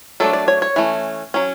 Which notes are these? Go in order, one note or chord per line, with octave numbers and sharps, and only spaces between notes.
F#3 A3 D4 A4
D5
C#5
C#5
E3 A3 C#4
F#3 C#4